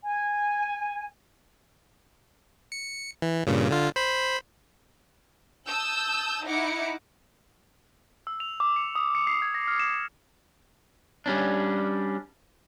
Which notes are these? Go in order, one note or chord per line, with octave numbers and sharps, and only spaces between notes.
G#5
C#7
E3
G2 A#2 C#3
D3 F4
C5 B5
A5 D#6 E6 G6
D#4 E4 F#5 D6 C#7
E6
F7
D6
C#7
D#6
C#7
C7
G#6
A#6
F6
E7
E7
G3 C#4 D4